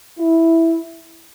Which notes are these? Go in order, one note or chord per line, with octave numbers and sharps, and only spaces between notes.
E4